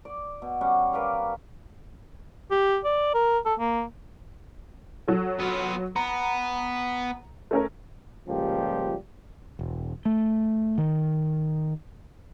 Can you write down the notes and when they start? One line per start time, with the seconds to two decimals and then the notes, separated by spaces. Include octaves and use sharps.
0.05 D5
0.42 B2
0.61 G3 C#4 F#5
0.93 A#4 B4 D5 F5
2.51 G4
2.84 D5
3.14 A#4
3.46 A4
3.59 A#3
5.08 F#3 A4
5.40 B3 F4
5.96 B3 A#5
7.51 A3 C#4 A#4
8.27 C#2 A#2 F3 G3 G4
9.59 E1
10.05 A3
10.78 D#3